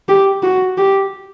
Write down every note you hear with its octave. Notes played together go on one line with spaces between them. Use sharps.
G4
F#4
G4